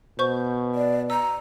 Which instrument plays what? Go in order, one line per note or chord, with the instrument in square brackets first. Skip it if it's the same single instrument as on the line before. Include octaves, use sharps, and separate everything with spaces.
[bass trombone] B2 [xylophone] C5 C#6 G6
[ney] D5
[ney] A#5 [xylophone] E6